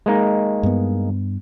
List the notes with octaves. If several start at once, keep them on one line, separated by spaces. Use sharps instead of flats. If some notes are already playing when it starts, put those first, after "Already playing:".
G#3 A#3 D#4
G2 B3